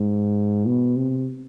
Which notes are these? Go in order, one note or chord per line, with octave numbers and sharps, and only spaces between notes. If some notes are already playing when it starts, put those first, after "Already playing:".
Already playing: G#2
B2
C3